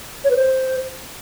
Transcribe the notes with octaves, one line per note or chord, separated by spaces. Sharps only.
C#5
B4
C5